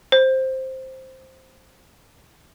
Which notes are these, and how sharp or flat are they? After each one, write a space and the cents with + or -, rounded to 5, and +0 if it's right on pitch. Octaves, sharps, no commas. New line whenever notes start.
C5 +5